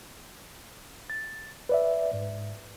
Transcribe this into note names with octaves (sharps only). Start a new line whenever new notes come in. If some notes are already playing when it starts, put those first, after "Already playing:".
A6
B4 D5 E5
G#2